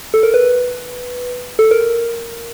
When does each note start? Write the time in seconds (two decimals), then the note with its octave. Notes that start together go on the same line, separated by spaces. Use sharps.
0.14 A4
0.23 A#4
0.34 B4
1.59 A4
1.71 A#4